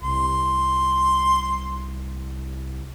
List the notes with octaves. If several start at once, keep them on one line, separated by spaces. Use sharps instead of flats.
C2 C6